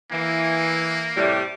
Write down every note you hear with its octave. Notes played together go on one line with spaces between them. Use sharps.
E3 A#3
A2 C3 G3